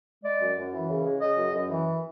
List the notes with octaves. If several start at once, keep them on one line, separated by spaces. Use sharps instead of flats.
G#3 D5
F#2
F#2
E3
C#3
G#3
C#3 D#5
F#2
F#2
E3